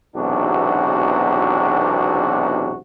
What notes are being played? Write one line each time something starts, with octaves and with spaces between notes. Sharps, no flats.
B1 E2 G#2 C3 D4 F#4